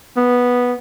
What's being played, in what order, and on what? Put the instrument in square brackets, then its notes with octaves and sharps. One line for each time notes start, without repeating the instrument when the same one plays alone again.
[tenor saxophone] B3